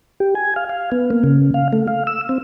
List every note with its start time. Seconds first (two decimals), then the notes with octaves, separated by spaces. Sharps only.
0.20 G4
0.35 G#5
0.56 F5
0.69 F5
0.92 B3
1.10 A#3
1.24 C#3
1.54 F5
1.73 A3
1.88 F5
2.07 E6
2.29 C4